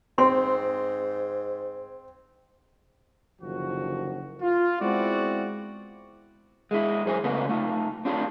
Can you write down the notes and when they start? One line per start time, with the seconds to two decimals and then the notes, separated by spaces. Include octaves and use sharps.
0.18 G#2 C4 C6
3.40 F#1 D3 D#3 F3 F#4
4.42 F4
4.81 G#3 B3 C4 E4 F#4 D5
6.71 G#3 E4
7.06 F#2 C5 G#5
7.24 C#3 A3 A#3 C4 B4
7.49 A3 D#4 F4
8.05 C4 D4 F4 G4